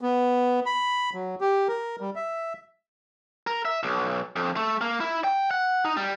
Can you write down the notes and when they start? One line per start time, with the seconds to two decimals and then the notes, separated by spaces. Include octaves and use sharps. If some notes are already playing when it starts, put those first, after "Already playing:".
0.01 B3
0.66 B5
1.14 F#3
1.41 G4
1.68 A#4
2.01 G3
2.16 E5
3.47 A#4
3.65 E5
3.83 B1
4.36 F2
4.56 A3
4.81 A#3
5.00 E4
5.24 G5
5.51 F#5
5.85 D#4
5.97 G3